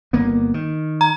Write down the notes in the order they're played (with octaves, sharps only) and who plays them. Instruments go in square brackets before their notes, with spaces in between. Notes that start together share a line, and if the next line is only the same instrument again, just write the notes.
[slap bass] G1 A#3 B3
D#3
[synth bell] A#5